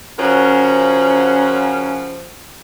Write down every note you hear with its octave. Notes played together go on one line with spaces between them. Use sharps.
C#3 F3 C#4 F#4 A#4 F#5